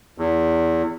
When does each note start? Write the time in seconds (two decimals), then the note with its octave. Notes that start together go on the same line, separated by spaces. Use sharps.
0.18 E2